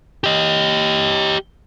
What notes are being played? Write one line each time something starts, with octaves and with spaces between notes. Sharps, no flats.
G4 D#5